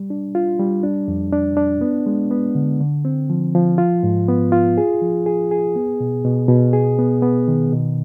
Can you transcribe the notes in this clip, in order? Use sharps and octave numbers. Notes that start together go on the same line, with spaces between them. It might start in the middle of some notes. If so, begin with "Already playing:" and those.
Already playing: G3
D4
F4
G3
D4
F2
D4
D4
B3
G#3
B3
D3
D3
C4
F3
F3
F4
G#2
B3
F4
G#4
F3
G#4
G#4
B3
B2
B2
B2
G#4
B3
B3
D#3
B2